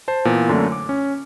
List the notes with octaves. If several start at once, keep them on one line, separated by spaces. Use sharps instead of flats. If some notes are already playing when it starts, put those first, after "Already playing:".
C5 A5
A#2 E3 B3
F#2 D3 A3 A#3 D4
D6
C#4